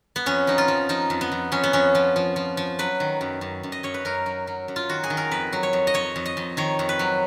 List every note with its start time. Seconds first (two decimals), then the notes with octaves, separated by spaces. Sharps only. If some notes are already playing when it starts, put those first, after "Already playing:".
0.16 B3
0.26 F2 C#4
0.47 F3 D#4
0.58 F4
0.68 F3
0.89 F3 D#4
1.10 F2
1.21 B3
1.32 F2
1.52 F2 C#4
1.63 B3
1.73 F2 C#4
1.95 F3
2.16 F3
2.36 F3
2.57 F3
2.79 F#3 B4
3.00 D#3
3.21 F#2
3.41 F#2
3.63 F#2
3.72 D#5
3.83 F#2 C#5
3.94 B4
4.05 F#2 A#4
4.26 F#3
4.47 F#3
4.68 F#2
4.76 F4
4.89 D#3 F#4
5.04 G#4
5.10 D#3
5.17 A#4
5.31 F2 B4
5.53 F#3
5.63 C#5
5.73 F2
5.87 D#5
5.94 F2 C#5
6.16 F2
6.26 D#5
6.37 F2
6.57 D#3 C#5
6.79 F2
6.89 B4
6.99 F#3